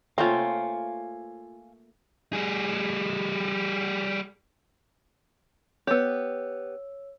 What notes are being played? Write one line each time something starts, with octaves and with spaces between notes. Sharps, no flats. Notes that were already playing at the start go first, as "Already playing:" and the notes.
A3 A#3 C4 C#4 F4 F5 G#5
G3 G#4
B3 G4 C#5 E6